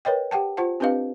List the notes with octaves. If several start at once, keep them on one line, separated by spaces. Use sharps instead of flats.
A#4 B4 C#5 D#5 G5
G4 F#5 G5 A5
F4 C5 F#5 A5
C4 D4 G4 B4 D#5 F5